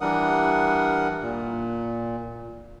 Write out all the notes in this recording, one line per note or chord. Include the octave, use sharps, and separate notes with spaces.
E3 G3 D4 A#4 F#5 D#6
A#2